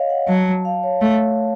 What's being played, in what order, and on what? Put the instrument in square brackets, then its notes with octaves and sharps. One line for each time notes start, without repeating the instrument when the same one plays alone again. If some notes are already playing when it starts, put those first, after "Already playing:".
Already playing: [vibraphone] C#5 D#5 F5
F#5
[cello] F#3 [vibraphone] A5
[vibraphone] F5
C#5
[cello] A3